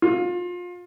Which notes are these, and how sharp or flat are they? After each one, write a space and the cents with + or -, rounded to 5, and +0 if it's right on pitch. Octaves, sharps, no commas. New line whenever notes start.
F4 +25